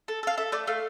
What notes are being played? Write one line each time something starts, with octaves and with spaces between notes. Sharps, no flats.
A4
A4 F5
A4 E5
A3 D5
A3 F5